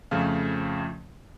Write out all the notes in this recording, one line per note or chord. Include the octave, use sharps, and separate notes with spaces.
F2 C#3 F3 A3 F5